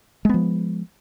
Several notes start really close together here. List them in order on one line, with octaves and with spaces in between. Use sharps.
G#3 B3 F3